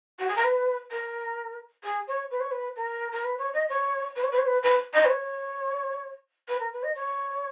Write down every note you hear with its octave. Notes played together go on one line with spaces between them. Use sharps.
F#4
G#4
A#4
B4
A#4
G#4
C#5
B4
C#5
B4
A#4
A#4
B4
C#5
D#5
C#5
B4
C#5
B4
C#5
B4
B4
D#5
B4
C#5
B4
A#4
B4
D#5
C#5